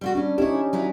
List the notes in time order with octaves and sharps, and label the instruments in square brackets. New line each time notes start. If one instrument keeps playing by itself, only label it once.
[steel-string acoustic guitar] G3 F4 F#4
[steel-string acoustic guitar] G3 C#4 [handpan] D4
[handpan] C#4 D#4 G4 [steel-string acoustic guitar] E4 C#5
[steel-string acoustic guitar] F#3 D#4 E4